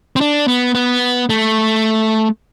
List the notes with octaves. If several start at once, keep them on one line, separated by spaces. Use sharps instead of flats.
C4
D4
B3
B3
A3